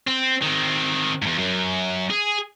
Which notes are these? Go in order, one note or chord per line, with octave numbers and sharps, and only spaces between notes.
C4
D#3 C4
E2 G#2
F#2
G#4